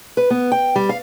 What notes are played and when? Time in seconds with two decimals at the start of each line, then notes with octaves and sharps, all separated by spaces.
0.17 B4
0.30 B3
0.52 G5
0.76 G3
0.89 F5